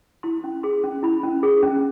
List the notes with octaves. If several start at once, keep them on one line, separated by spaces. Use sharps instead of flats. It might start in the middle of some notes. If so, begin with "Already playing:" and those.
E4 C6
C#4
G#4 C6
C#4
E4 B5
C#4
G#4
C#4